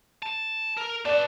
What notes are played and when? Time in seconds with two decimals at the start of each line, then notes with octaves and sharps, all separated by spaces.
0.23 A5
0.77 A#4
1.05 B4 D5 A5